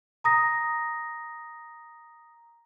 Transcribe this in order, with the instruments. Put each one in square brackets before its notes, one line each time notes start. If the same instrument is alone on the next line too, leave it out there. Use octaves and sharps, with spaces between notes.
[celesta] A#5 D#6 A#6